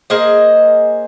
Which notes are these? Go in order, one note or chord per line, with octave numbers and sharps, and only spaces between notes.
A#3 G#4 C5 D#5